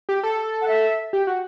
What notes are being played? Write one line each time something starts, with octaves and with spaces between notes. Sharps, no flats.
G4
A4
F#5
E5
G4
F#4